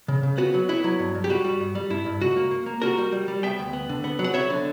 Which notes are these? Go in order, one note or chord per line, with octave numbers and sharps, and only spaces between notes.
C#3
C#3
B3 F#4
F#3
B3 E4
F#3
G2
G2
G4
G3 F#4
G3
G2
G3
G2 E4
G2
C#2 F#4
A#3
A#3
A#3
G3 F#4 A#4
G3
G3
G3
B3 E5 G5
D2
B3
D3
B3
F#3
F#5
B3 C#5 E5
D3